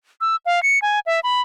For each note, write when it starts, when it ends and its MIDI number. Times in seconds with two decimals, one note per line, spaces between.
0.21 0.36 88
0.46 0.62 77
0.63 0.79 97
0.82 1.00 80
1.06 1.20 76
1.23 1.42 83